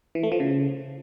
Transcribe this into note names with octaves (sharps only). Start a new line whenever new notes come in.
E3
A3
F3
C#3